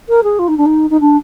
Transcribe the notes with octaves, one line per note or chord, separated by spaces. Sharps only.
A#4
G#4
F4
D#4
D4
D#4
D#4
D4